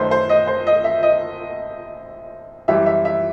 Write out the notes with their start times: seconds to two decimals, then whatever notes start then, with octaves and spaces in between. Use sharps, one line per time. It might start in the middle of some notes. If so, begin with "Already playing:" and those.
Already playing: F#2 D#3 A3 B4 C5
0.11 C5
0.29 D#5
0.47 C5
0.67 D#5
0.84 E5
1.03 D#5
2.68 F#2 E3 G3 E5
2.86 E5
3.05 E5